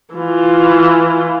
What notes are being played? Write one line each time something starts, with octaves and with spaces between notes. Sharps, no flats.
E3 F4